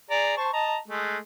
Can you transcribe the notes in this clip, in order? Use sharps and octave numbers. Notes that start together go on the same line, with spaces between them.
G#4 D5 A#5
C5 A5 C#6
D#5 A5 A#5
G#3 A3